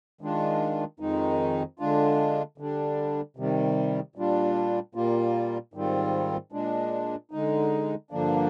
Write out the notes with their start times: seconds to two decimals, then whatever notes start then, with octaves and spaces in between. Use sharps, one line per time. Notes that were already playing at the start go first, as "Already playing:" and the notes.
0.21 D#3 G#3 D4 F4
1.00 F2 D#3 G#3 D#4
1.79 D3 G#3 D4 F4
2.58 D3 G3 D4
3.37 C3 D#3 G3
4.16 A#2 G3 D4 F4
4.95 A#2 G3 A#3 F4
5.74 G#2 D#3 G3 C4 F4
6.52 A#2 G#3 D4
7.31 D3 G#3 D#4
8.11 G2 D3 F3 A#3 D4